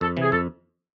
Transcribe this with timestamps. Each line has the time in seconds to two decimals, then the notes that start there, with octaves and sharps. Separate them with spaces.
0.01 F2 A4
0.17 C3 E3
0.22 G#4
0.32 F2 A4